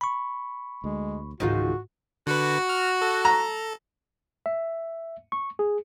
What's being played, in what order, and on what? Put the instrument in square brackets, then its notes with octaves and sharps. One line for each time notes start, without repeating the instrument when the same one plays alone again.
[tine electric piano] B5 C#6
[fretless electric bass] D2 [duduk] G#3
[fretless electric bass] C#2 D#3 E3 [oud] G#2 D#4 F4 [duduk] F#4
[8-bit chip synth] D3 B4 [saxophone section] F#4
[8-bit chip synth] F6
A4
[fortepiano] A#5
[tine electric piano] E5
C#6
G#4